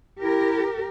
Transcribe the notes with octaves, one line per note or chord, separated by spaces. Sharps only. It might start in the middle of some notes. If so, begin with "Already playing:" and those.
E4 G4 A#4